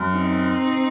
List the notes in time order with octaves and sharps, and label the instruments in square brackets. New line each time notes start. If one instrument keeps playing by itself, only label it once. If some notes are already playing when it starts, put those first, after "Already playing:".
Already playing: [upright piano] F#2
[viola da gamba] C4 D#4